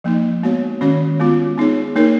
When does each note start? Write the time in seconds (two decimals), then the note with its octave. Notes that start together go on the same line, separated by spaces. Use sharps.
0.04 F3 A#3 D#4
0.43 G#3 B3 F#4 C#5
0.81 D#3 G#3 C#4 F#4 C#5
1.20 G#3 B3 F4
1.58 B3 D#4 G#4 C#5
1.96 A#3 D#4 A#4 C#5